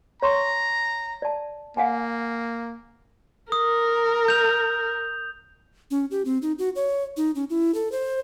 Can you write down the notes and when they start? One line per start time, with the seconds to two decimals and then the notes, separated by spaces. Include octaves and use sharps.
0.22 C#5 A#5 C6 C#6
1.22 D5 A5
1.77 A#3 F5 F#5 G#5
3.52 A#4 D#6
4.28 G6 F7
5.91 C#4
6.11 G4
6.25 C4
6.42 D#4
6.59 F#4
6.76 C#5
7.17 D#4
7.35 C#4
7.50 E4
7.74 A4
7.92 C5